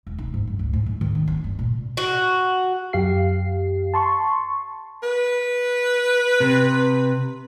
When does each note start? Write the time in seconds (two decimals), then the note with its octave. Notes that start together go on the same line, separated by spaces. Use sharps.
0.07 E1
0.19 D#4
0.34 G#2
0.47 F#2
0.59 D2
0.73 G#2
0.86 F#2
1.01 D#3
1.15 D4
1.28 B3
1.44 G2
1.59 A#2
1.97 F#4
2.93 F#2 G4 F5 C7
3.94 A5 C6 C#6
5.03 B4
6.40 C3